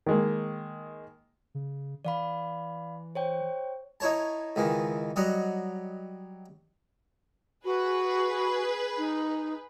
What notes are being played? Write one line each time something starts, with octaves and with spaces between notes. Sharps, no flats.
D#3 G#3 A#3
C#3
E3 D5 F5 B5
C5 C#5 G5
D#4 E4 C#5 A5
C#2 D#3 E3
F#3 G3 D#5 F#5
F#4 G#4 B4
D#4